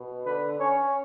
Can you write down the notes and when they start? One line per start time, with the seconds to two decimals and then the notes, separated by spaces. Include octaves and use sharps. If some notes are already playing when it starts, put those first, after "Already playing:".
Already playing: B2
0.26 D3 B4
0.60 C#4 C#5